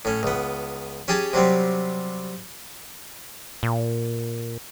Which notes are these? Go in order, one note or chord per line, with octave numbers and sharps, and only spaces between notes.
A2 C#4
C#2 B3
C#4 G4 G#4 G5 A5
C3 F#3 G3 C4
A#2